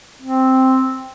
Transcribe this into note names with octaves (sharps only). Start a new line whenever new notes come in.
C4